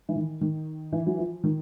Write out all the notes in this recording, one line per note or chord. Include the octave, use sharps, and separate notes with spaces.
E3
D#3
D#3
E3
F#3
F3
D#3